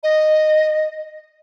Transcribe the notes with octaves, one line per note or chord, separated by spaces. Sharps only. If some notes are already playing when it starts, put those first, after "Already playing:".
D#5